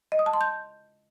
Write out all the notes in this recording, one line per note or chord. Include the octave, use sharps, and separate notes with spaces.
D#5
D#6
A5
C6
G6